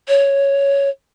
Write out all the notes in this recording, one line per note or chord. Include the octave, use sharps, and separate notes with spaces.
C#5